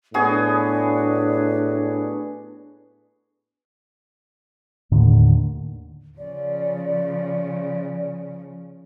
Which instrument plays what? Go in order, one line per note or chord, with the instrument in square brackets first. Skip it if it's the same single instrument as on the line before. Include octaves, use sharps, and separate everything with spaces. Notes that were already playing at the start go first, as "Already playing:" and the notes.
[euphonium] A2 [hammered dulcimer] B3 F#4 G#4 [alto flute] D4
[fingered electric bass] D#2 A2 D3 D#3
[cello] C#3 F3 [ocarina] D5